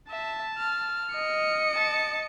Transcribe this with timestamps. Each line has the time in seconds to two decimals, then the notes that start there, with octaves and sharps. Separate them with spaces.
0.10 E5 A5
0.58 F6
1.13 D#5 C#7
1.74 A5